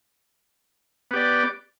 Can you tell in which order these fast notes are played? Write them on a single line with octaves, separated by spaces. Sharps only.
B3 G4 D5